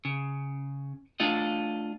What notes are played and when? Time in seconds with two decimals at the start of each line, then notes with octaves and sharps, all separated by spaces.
0.05 C#3
1.20 A3 D4 F4 D#5